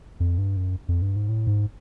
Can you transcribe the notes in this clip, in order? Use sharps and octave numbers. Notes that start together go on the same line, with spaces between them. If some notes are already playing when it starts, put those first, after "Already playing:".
F2
G2
F#2
F2
G2
G#2
A2
G#2